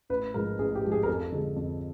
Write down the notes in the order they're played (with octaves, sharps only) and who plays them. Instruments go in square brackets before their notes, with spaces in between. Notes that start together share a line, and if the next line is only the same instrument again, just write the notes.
[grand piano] A1 B4
G#2 F3 G#3 A#4
A1 G#4
G4
G#2 F3 G#3
G#4
A#4
F2 A4
D3 F3 G#3
F2